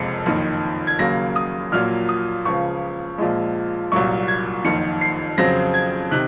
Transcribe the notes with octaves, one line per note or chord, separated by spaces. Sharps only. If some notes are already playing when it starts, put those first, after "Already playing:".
Already playing: F#1 F2 C3 F3 G#3 C7 C#7
F#1 F2 D#3
G#6
D#2 C#3 F#3 A#3 A#6
D#6
A#1 A#2 F#3 A#3 F6
D#6
C#2 C#3 F3 C#6
A#1 A#2 F3 G#3
C2 A#2 F#3 A#3 C#6
G#6
F#1 F2 D#3 C#7
C7
F2 C#3 F#3 C4 A#6
G#6
C3 D#3 F#6